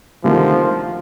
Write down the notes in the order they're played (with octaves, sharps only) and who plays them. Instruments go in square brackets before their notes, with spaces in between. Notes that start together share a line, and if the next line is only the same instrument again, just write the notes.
[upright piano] D2 C3 D#3 [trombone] F3